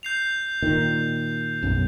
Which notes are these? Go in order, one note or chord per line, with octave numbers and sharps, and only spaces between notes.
G6 C7 F7
A#2 D#3
B1 F#2